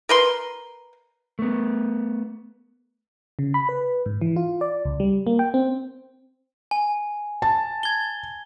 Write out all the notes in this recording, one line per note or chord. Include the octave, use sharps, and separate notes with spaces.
A#4 B4 C6
A3 B3
C#3
B5
B4
G#2
E3
F4
D5
C#2
G3
A#3
G5
C4
G#5
A5
G#6 G7